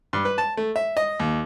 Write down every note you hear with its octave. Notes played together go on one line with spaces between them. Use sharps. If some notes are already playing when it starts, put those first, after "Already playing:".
G2
B4
A5
A3
E5
D#5
D#2